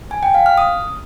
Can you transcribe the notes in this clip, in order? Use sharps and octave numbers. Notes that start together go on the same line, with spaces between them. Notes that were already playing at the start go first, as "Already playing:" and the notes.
G#5
G5
F5
F6
D#6